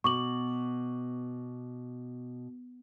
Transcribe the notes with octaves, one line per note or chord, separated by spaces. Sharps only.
B2 C#6 D6 F#7